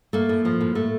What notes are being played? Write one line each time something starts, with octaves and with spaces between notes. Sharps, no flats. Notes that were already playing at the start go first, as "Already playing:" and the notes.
A3 A#3
A2
F3
A2
A3